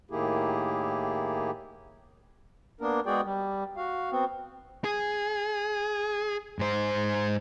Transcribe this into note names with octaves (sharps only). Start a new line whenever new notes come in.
A2 D#3 A#3 E4 G4 G#4
A#3 B3 D4 A#4
G#3 B3 F#4 G#4 D5 G5
G3
F#4 F5
B3 C4 F#4
G#4
G#2 C5